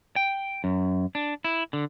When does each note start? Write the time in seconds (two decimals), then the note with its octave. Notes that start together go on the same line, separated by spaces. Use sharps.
0.16 G5
0.64 F#2
1.15 D4
1.44 E4
1.73 D3